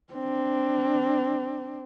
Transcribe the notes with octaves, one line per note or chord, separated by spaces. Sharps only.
C4 D4